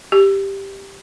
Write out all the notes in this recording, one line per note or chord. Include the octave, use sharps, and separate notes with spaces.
G4